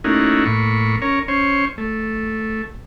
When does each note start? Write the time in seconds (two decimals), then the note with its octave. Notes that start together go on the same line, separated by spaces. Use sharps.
0.04 A3 A#3 C#4 D#4 E4 F#4
0.46 A2 A#3 B5 C#6
1.02 C#4 A#4 C#5
1.28 C#4 C5 C#5
1.78 A3